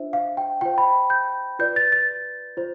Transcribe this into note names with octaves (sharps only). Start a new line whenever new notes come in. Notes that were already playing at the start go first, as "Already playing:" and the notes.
Already playing: D4 F4 C5 E5
F5
G5
F4 C5 G5
B5
G6
F4 B4 D5 G6
A6
A6
F4 C5